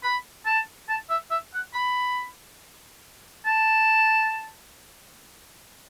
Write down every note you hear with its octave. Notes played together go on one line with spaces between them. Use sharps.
B5
A5
A5
E5
E5
F#5
B5
A5